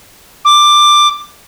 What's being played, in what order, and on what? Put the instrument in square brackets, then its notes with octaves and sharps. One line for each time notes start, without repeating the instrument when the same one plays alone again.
[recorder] D6